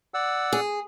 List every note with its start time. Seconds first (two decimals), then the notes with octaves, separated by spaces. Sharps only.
0.14 D5 F#5 E6
0.53 G#4